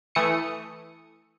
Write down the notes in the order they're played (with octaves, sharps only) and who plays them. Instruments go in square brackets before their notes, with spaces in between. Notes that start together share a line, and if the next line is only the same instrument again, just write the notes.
[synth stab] E3 A3 D#6 C#7